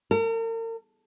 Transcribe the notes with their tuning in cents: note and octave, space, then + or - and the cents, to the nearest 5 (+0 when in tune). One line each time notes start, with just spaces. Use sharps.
A#4 -40